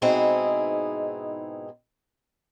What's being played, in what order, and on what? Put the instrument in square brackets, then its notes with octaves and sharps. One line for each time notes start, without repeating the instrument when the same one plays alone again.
[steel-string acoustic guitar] G#2 B2 C4 D#4 E4 G#4